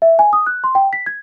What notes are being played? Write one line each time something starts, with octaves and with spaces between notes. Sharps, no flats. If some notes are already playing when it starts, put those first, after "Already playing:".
E5
G#5
D#6
F#6
C6
G5
B6
G#6